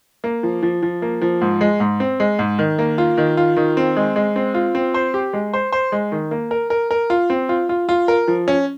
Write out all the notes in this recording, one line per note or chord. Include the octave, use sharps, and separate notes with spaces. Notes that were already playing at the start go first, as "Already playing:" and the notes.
A#3
F3
F3
F3
A#3
F3
G#2
G#3
G#2
C4
G#3
G#2
D#3
A#3
F4
D#3
F4
D#3
C4
G#3
G#3
C4
F4
C4
C5
G4
G#3
C5
C5
G#3
D#3
A#3
A#4
A#4
A#4
F4
C4
F4
F4
F4
A#4
F3
C#4